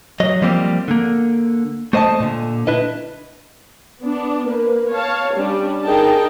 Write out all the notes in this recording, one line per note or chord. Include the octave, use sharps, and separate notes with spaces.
F#3 D#5
F3 G3 A#3 C4 G4
D3 A#3
A3 C5 D#5 G#5 A5
A#2 D3
D4 E4 B4 D#5
B3 D4
A#3 B4
C#5 F5 A5
G3 C#4 D4
D#4 G#4 A#4 G5 A5